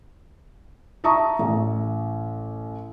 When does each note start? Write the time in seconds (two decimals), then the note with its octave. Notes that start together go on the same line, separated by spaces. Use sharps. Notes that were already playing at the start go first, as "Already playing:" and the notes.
1.04 E5 A5 A#5 C#6 D#6
1.39 A1